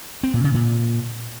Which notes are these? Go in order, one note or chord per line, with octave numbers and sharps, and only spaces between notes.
C4
A#2
C#3
A#2